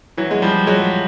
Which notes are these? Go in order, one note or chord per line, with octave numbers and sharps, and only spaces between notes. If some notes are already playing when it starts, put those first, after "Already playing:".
E3 F#3
G#3
F3 G3
F#3 G#3